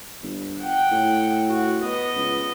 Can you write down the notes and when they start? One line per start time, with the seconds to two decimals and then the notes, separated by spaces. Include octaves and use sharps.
0.22 G1
0.60 F#5 G5
0.91 A2
1.49 F#4
1.81 B3 D#5
2.16 C#2